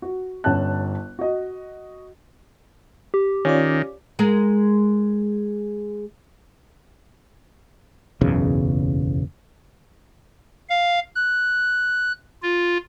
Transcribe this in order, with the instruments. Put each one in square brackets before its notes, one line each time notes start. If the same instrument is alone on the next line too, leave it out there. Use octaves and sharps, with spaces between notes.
[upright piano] F#4
G1 C#4 A5 F#6
F#4 D#5
[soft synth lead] G4
[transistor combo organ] D#3 [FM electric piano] C#4 F4 D5
[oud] G#3 G#4 A#4
[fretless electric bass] F#1 B1 E2 C#3
[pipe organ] F5
F#6
F4